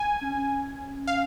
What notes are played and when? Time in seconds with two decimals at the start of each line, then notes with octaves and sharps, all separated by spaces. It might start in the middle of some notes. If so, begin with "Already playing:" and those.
Already playing: G#5
0.21 C#4
1.07 F5